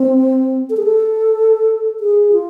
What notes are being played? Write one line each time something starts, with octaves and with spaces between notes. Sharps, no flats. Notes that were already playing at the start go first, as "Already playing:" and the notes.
Already playing: C4
A4
G#4
A4
G#4
F4